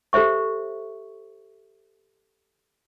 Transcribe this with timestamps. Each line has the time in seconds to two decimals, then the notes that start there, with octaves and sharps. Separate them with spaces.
0.13 G4 A4 C5 E5 C#6